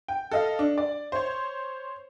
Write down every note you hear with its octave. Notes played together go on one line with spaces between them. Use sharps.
G5
A4 D#5 F5
D4
D5
C5 C#5